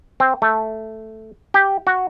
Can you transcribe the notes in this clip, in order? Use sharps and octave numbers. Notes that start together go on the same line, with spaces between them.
C4
A3
G4
F#4